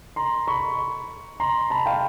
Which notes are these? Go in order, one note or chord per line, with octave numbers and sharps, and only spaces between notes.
A#5 C6
B5 C#6
A#5 C6
A5 B5
F5 G5